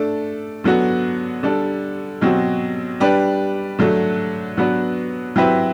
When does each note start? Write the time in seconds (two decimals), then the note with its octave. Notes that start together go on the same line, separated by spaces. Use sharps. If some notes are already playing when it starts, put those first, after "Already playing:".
Already playing: A3 D4 A4
0.64 D3 F#3 B3 F#4
1.43 D3 G3 D4 A4
2.21 B2 F#3 C4 F#4
3.00 G3 D4 G4 B4
3.79 D3 F#3 A3
4.57 F#3 B3 D4 F#4 B4
5.36 F#3 C4 E4 G4 B4